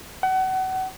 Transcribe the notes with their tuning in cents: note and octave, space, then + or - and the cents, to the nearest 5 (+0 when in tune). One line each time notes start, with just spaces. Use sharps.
F#5 +30